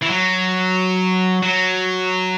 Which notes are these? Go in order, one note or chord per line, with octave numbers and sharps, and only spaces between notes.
E3
F#3
F#3